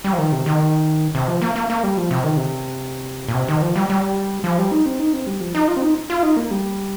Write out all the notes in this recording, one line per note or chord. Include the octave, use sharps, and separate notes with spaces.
G3
F3
D#3
C3
D#3
C3
F3
A#3
A#3
A#3
G3
F3
C3
D#3
C3
A#2
C3
D#3
F3
G3
G3
F3
G3
D#4
C4
D#4
C4
G3
F3
D#4
F4
C4
D#4
F4
D#4
A#3
G3